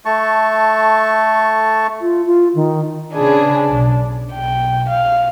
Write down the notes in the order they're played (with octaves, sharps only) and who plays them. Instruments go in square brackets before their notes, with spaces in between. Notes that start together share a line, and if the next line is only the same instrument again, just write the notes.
[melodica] A3 A5 C#6
[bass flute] F4
F4
D#3
[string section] C#3 G#4 B4 [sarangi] D4
[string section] B1
[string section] B1 [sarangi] G5
[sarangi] F5